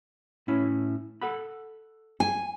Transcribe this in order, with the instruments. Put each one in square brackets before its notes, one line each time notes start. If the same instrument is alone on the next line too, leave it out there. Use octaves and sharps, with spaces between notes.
[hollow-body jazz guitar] A2 C#4 E4
A4 F#5 B5
[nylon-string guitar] G#5